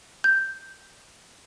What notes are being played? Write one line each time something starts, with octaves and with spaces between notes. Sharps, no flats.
G6